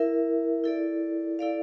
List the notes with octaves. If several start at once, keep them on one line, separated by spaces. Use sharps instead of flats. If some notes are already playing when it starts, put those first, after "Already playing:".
Already playing: E4 A#4 E5
E4 A4 D5
E4 A4 D5 F5